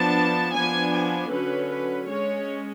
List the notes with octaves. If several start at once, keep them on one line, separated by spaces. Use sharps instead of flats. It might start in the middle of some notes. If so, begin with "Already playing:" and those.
Already playing: F3 B3 D4 A5
F3 B3 D4 G#5
G#5
D3 F#3 C#4 B4
B4
G#3 C#4 C#5